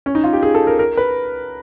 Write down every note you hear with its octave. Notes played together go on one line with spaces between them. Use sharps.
C#4
D#4
F4
G4
G#4
A4
A#4
A#4
B4